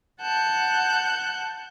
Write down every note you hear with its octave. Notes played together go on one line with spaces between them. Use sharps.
F#5 A5 F#6 G6